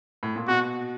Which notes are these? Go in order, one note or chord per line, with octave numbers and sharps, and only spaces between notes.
A2
A#2
B2 F#4